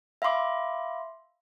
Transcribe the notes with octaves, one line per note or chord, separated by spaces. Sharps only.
E5 F5 B5 C6 D6